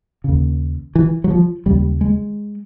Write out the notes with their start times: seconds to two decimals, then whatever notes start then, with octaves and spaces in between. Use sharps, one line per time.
0.24 D#2 C#3
0.95 E3
1.24 F#3
1.30 F3
1.66 D#2 C#3 G3
2.01 G#3